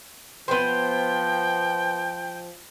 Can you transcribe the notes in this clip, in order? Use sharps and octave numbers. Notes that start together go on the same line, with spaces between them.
F3 B3 C5 G5